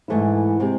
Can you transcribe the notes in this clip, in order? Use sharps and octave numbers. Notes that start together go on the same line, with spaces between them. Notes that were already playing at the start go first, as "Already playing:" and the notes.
G#2 E3 A3 E4
C3 G#3 C4